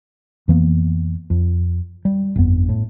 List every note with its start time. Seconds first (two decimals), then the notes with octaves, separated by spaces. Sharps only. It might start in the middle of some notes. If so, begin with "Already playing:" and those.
0.48 F2 E3 A#3 B3
1.30 F2
2.05 G3
2.36 G1 F2 B3
2.69 A2